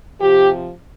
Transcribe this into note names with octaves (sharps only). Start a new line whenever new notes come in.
C3 F3 G4